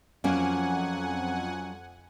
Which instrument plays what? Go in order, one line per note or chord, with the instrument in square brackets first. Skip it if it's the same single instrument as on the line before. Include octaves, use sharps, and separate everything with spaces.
[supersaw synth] F2 F#5 G#5 [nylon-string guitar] F#3 A#3 C#4